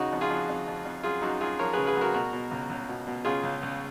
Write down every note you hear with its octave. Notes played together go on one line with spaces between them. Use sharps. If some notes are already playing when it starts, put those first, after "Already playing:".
Already playing: C#3 D#4 F#4
F2
F4 G#4
F2
F2
F2
F2
F#2 F4 G#4
F#2 D#4 F#4
F#2 F4 G#4
F3 A#4 C#5
C#3 G#4 B4
G#4 B4
F#2
F#4 A#4
B2 F#4 A#4
B2
C#2
C#2
B2
B2
C#3 F4 G#4
C#2
C#2